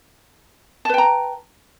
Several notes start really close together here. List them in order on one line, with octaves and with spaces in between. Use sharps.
A5 B4 G5 A#5